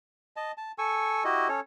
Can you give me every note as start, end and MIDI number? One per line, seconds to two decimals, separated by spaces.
0.36 0.52 75
0.36 0.52 81
0.58 0.72 81
0.78 1.23 69
0.78 1.23 80
0.78 1.23 85
0.78 1.23 88
1.25 1.48 64
1.25 1.48 66
1.25 1.48 67
1.25 1.48 75
1.49 1.60 61
1.49 1.60 69
1.49 1.60 73